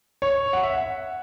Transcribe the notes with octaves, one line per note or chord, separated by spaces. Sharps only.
C#5
F#5
E5
F#5